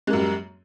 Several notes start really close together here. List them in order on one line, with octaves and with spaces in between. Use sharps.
G#3 A#3 F#2 G3